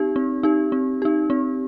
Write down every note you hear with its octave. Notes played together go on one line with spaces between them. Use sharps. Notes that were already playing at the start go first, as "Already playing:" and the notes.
Already playing: C4 D#4 G4
C4
D#4 G4
C4
D#4 G4
C4